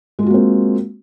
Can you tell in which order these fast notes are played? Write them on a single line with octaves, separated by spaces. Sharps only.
G#3 F4 F#4 A#3 C4